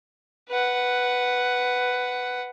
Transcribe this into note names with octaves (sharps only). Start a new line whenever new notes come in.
B4 F#5